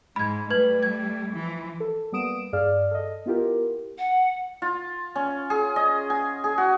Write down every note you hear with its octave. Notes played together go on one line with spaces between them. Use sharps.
G#2 G#3 B5 G#6
G3 A3 B4 G#6 F#7
G#6
E3 F3
A4
G3 A#3 B3 D#6 D7 E7
G2 G#4 D5 F5 F6
A4 D#5
B3 E4 F4 G4 A#4
F#5
F4
C#4
G#4
D#5
G#5
G#4
F#4